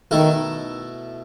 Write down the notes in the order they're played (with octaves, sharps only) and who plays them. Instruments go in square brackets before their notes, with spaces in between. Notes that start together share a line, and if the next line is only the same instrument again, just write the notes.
[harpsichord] B2 A3 E4 A4 [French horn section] D#3